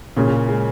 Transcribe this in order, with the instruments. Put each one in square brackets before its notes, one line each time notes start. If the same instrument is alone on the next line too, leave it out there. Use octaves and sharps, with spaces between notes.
[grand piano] A#2 A#3 C#4 G#4 [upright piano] C#3
[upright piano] C#3
G#3